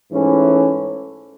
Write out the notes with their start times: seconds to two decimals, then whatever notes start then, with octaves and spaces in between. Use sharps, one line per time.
0.12 G#2 E3 A3 C#4